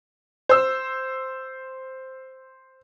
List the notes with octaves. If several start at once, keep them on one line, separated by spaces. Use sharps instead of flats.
C5 E6